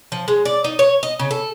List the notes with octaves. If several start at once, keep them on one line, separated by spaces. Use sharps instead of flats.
F3
G#3
D5
D#4
C#5
D#5
C#3
A4